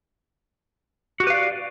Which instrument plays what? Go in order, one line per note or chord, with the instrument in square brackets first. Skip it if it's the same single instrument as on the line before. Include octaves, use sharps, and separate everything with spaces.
[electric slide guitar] F#4
G4
B4
F5
D5